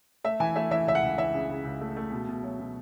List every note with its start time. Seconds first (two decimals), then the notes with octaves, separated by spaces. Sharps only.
0.24 A3 E5
0.40 E3 G#5
0.56 A3 E5
0.71 E3 E5
0.87 C#2 E5
0.95 F#5
1.03 C#2
1.18 E3 E5
1.34 C#3
1.49 C#3
1.65 C#2
1.81 A3
1.96 A3
2.12 B2
2.28 B2
2.43 F#3
2.59 B2